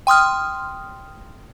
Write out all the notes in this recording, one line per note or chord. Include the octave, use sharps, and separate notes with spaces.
G5 C6 D#6 F6